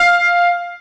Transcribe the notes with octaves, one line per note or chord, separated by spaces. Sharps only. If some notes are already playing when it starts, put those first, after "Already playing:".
Already playing: F5